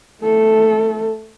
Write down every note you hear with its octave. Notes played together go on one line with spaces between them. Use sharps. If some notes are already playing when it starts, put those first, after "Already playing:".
A3 A4